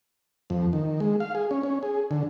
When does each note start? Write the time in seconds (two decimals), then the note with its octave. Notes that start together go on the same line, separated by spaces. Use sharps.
0.50 F2
0.73 D#3
1.00 G#3
1.20 F5
1.35 G#4
1.51 C#4
1.63 C#4
1.83 G#4
2.11 D3